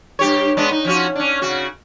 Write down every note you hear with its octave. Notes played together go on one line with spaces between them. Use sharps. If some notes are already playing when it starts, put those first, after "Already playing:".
G2 G4 C#5
G#3 B3 D4
D#4
F3 C#4 F#4
C#4 D4
C#3 F#4